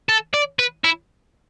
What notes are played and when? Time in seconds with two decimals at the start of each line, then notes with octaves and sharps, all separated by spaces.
0.09 A4
0.34 D5
0.59 B4
0.84 E4